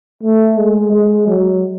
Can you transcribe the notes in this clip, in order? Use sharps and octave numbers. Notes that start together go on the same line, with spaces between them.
A3
G#3
G#3
F#3